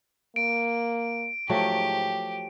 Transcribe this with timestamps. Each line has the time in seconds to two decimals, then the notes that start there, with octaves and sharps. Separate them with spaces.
0.36 A#3 D7
1.50 G#2 F3 F#3 A3 G4